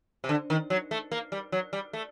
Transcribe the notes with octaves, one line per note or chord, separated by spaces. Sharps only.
C3
D3
D#3
F#3
A3
A#3
G3
F#3
G3
A3